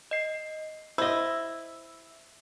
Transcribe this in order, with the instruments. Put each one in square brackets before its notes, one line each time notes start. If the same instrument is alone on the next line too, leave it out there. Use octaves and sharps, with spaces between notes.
[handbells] D#5 C7
[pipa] E4 [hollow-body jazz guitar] C5 D#5 [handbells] E6